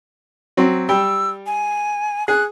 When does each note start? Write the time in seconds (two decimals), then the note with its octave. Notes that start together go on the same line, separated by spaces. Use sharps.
0.57 F#3 C4
0.89 G3 G5 E6
1.47 G#5
2.28 G#4 F#6